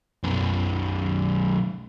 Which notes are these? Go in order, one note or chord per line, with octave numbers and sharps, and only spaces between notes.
B1 F#2